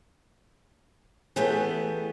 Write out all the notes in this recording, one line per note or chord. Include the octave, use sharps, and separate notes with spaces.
E3 A3 B3 G4 G#4